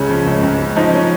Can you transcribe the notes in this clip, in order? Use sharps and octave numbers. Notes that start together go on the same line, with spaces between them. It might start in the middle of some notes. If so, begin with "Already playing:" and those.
Already playing: C#2 C#3 C#4
F3
C#2
C#2
C#3
F3 D#4
C#4